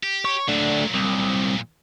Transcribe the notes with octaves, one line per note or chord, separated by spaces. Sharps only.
G4
C#5
A#2 F#3 A3 D4
C2